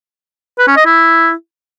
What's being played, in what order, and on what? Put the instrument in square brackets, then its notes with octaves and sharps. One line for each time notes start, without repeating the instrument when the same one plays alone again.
[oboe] B4
C#4
D#5
E4